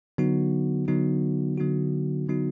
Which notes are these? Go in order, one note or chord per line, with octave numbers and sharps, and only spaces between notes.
D3 F#3 B3 D#4 F#4
D3 F#3 B3 D#4 F#4
D3 F#3 B3 D#4 F#4
D3 F#3 B3 D#4 F#4